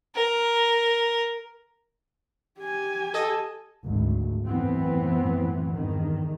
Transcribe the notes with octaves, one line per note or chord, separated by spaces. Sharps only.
A#4
G4 G#5
A4 D#5
G#1 D2
F#2 A2 E3 B3 C4
E2 G2 D#3